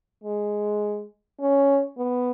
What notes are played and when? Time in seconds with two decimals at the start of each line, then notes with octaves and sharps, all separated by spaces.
0.24 G#3
1.40 C#4
1.97 B3